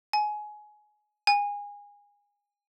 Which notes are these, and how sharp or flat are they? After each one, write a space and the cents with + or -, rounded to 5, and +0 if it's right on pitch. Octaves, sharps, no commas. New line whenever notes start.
G#5 +20
G#5 -25